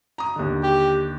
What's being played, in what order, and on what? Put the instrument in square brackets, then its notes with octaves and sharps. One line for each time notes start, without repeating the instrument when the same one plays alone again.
[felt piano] A#5 D#6
D#2 D3
[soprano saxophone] G4